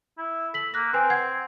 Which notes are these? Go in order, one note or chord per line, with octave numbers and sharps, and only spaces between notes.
E4
A4 B6 F#7
A#3 F#6 A#6
C4 B4 G#5
F#5 G#6 C7